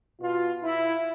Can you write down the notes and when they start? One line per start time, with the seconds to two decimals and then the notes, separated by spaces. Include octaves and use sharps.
0.20 B2 F4
0.63 E4